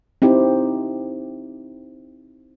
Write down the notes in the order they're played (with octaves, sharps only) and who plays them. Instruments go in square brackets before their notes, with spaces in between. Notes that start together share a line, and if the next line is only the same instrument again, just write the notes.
[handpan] C4 D#4 E4 G4